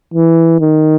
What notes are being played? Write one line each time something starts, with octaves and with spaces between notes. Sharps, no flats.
E3
D#3